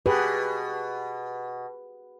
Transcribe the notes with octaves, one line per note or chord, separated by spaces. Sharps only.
B2 G4 G#4 B4